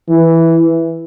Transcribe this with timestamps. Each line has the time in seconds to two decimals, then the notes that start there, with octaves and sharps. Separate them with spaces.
0.09 E3